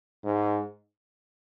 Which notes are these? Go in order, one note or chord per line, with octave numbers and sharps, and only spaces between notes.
G#2